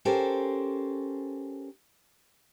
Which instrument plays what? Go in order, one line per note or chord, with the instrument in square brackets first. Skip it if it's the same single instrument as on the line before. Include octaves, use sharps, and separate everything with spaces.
[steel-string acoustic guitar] C#4 G4 A4 A#4 C5